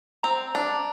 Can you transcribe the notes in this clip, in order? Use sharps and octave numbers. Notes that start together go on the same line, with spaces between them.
C4 A#5
D4